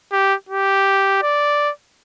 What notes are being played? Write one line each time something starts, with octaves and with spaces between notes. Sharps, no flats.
G4
G4
D5